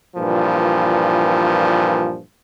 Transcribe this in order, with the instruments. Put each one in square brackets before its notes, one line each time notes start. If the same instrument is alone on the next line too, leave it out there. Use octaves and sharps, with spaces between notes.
[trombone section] G2 A#2 E3 F3